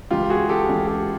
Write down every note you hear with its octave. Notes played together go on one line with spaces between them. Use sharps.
C#2 C#3 E3 F4 G4
F#4 G#4
G4 A4
C#2 C#3 E3
G4 A4